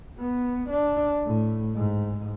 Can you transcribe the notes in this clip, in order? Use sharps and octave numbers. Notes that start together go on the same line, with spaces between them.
B3
D4
A2
G#2